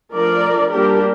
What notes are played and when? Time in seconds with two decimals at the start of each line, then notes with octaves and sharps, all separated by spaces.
0.13 F3 A3 D4 A#4 D5
0.71 G3 A#3 D4 G4 A#4